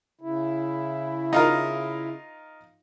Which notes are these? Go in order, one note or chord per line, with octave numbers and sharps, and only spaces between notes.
C#3 E4
D#4 F4 A#4